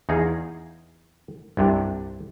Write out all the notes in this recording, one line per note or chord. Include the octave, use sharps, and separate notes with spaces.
E2 D#4 G#4 F5 A#5
C2 G2 C3 D4